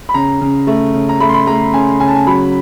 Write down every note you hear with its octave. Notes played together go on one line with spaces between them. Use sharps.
B5
C#3 A#5
C#3
A3
C#3
A#5
A3 B5
C6
B5
A3 A#5
C#3 G#5
C#3 G#5
A5
G#5
F#3 B5